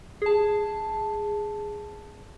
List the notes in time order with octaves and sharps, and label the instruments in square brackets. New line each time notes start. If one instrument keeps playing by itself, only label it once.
[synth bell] G#4 A5